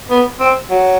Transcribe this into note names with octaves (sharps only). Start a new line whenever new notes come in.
B3
C4
F#3